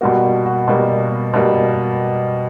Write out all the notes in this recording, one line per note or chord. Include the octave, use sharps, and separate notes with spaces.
B2 G3 A#3 F#4
F#4
B2 G3 A#3
B2 G3 A#3